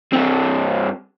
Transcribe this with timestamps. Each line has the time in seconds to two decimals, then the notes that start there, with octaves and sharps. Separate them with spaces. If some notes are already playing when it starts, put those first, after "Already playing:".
0.13 G2 C4